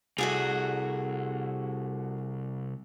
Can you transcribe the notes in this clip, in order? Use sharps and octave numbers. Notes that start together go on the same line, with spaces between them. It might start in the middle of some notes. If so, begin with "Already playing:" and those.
C2 A3 F#4 G#4